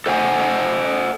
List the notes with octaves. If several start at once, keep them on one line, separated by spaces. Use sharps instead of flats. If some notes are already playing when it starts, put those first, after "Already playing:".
A4 C5 F#5 G#5